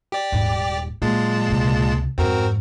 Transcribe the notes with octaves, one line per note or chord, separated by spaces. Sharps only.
G4 D5
D#1 G#2
A#2 F#3 G#3 A#3 A5
C#2 C3
F2 G#2 C4 F#4 A#4